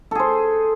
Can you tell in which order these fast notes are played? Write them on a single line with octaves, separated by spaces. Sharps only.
A4 G#4 C5